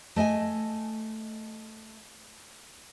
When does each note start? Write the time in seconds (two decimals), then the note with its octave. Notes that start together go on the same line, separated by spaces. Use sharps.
0.16 A3 D#5 G5 G#5